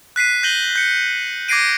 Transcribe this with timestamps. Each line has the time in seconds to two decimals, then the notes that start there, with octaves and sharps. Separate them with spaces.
0.16 F#6 B6 C7 D#7
0.43 G6 A#6 D#7 F#7 G7
0.76 G6 C#7
1.49 D6 G#6 A#6 C7 D7 D#7